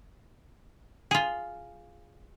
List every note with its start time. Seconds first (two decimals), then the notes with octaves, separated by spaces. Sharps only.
1.11 F4 G#4